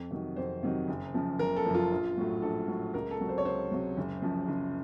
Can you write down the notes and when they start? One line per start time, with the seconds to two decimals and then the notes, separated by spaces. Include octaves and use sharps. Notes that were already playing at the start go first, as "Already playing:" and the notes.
Already playing: F2
0.11 C3 D#3 F#3
0.36 F2 C5
0.63 C3 D#3 F#3
0.88 F#1
1.14 F#2 C#3 F3
1.39 F#1 A#4
1.56 A4
1.66 F#2 C#3 F3
1.75 F4
1.92 A#1
2.17 A2 F#3
2.42 A#1 A4
2.68 A2 F#3
2.94 C#2 A#4
3.11 A4
3.20 C3 F#3
3.29 C5
3.38 C#5
3.45 C#2 C5
3.72 C3 F#3
3.97 F#1
4.22 F#2 C#3 F3
4.48 F#1